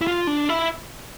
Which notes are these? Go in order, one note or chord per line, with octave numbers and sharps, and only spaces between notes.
E4
F4
D4
E4